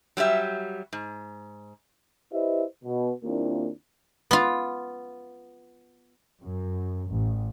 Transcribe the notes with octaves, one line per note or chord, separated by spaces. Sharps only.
F#3 G3 G4 E5
G#2
E4 G4 B4 C5 D#5 E5
B2
D#2 A#3 C4 D4 E4 F4
B3 F4
F#2
A1